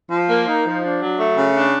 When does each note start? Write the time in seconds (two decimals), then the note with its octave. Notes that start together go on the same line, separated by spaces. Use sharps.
0.11 F3
0.29 A#3
0.46 D#4
0.65 F3
0.83 D4
1.01 F#3
1.18 A3
1.37 C#3
1.55 D4